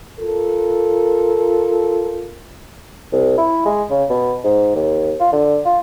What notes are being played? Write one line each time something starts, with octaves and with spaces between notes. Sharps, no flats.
F4 A4 A#4
C2
E4
G#3
C#3
B2
G#2
D#2
F4
D3
F4